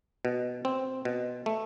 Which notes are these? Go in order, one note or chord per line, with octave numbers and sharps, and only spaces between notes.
B2
C4
B2
A3